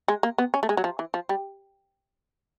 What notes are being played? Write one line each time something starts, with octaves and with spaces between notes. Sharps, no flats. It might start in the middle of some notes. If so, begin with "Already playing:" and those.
G#3
A#3
B3
C#4
A3
G#3
F#3
F3
E3
F3
G3